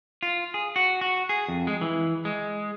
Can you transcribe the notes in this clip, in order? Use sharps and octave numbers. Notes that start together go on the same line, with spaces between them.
F4
G#4
F#4
F#4
G#4
F2
G#3
E3
G#3